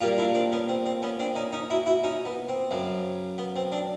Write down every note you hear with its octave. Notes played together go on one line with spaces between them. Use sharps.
A#2 G3 A#3 F4 G4
D4 E4
C4 D4
B3 C#4
C4
C4
B3 C#4
C4 D4
C#4 D#4
C#4 D#4
E4 F#4
E4 F#4
C#4 D#4
B3
C4
F#2 C#3 F#3
B3
C4
C4 D4